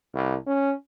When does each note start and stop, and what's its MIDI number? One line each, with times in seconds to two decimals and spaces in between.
0.14 0.35 36
0.46 0.73 61